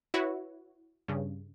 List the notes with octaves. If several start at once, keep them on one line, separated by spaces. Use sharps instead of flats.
E4 F#4 B4 C#5
G2 C#3